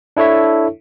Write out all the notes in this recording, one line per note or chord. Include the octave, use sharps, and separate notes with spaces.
D4 E4 A4 C#5 E5